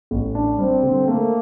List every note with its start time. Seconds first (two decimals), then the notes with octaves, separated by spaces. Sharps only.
0.11 A1
0.35 D4
0.59 G3 C4
0.83 D3
1.07 A3 A#3